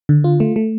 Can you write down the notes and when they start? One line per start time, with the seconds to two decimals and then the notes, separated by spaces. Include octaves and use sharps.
0.09 D3
0.24 F4
0.40 A3
0.56 A3